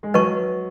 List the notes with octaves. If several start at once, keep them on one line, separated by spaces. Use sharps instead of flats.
G#3
F#3 B4 D#5 A5 C#6